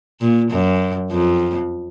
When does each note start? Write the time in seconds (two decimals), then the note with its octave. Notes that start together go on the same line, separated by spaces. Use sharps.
0.21 A#2
0.51 F#2
1.12 F2